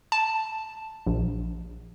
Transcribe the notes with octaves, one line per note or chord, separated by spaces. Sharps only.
A5
A#1